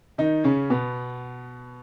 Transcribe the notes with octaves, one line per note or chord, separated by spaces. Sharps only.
D#3 D#4
C#3 C#4
B2 B3